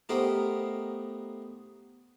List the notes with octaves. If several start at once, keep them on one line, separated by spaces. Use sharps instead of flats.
A3 B3 D#4 G4 A#4 C5